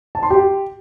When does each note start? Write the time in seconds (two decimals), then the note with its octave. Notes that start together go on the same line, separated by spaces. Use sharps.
0.15 A5
0.23 C6
0.30 G4